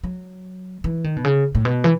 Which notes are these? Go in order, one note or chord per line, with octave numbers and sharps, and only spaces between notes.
F#3
E3
D#3
B2
C#3
A2
B2
E3